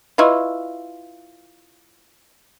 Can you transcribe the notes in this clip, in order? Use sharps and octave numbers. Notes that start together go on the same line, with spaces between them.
E4 F4 B4 D#5 C#6